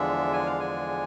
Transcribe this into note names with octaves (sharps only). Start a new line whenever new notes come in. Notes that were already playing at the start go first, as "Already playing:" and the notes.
Already playing: E2 D3 F3 G#3 D4 E5
G#5
F5
G#5